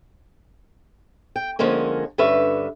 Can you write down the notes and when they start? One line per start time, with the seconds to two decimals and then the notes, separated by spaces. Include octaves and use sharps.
1.36 G5
1.59 D3 F3 G#3 A#3 C#4
2.18 G2 D3 C#4 B4 E5